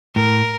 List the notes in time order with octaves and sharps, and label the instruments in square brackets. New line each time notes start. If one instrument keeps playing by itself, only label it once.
[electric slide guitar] A2 [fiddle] A#4